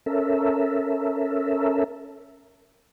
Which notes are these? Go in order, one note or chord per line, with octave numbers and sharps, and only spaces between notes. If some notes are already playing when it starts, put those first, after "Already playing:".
C#4 A4 A#4 E5